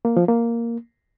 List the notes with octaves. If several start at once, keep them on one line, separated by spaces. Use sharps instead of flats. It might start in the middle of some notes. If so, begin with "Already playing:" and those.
A#3
F3
A#3